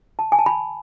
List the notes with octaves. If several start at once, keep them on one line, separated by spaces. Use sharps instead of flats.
A5
G#5
A5
B5